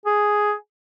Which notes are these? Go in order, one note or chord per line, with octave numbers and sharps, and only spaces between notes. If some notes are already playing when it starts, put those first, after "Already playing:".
G#4